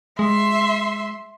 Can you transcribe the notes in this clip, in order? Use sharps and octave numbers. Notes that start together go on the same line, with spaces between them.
G#3 E5 C6